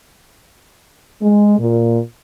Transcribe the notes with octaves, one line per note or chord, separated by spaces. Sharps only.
G#3
A#2